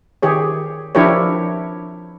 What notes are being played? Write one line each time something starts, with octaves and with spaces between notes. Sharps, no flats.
D#3 G4 G#4 C#5
F3 D4 E4 G4 A#4 C#5